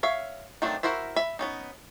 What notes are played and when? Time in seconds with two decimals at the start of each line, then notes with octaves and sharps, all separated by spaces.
0.03 C#5 E5 F5
0.62 D#3 F#3 A3 C4 D4
0.83 E4 F#4 A#4 C5 E5
1.16 E5 B5
1.39 B3 C#4 D#4